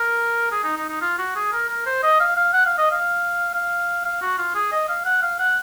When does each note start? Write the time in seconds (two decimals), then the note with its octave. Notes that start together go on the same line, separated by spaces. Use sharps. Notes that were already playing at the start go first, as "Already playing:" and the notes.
Already playing: A#4
0.52 G#4
0.64 D#4
0.77 D#4
0.89 D#4
1.02 F4
1.19 F#4
1.36 G#4
1.52 A#4
1.69 A#4
1.86 C5
2.03 D#5
2.20 F5
2.37 F5
2.53 F#5
2.66 F5
2.78 D#5
2.91 F5
3.54 F5
4.05 F5
4.22 F#4
4.38 F4
4.55 G#4
4.72 D#5
4.89 F5
5.06 F#5
5.22 F5
5.39 F#5